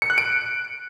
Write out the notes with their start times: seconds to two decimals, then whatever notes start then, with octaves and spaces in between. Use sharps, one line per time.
0.02 C#7
0.10 F#6
0.18 D7